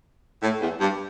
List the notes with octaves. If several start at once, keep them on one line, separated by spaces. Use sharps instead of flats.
A2
E2
G2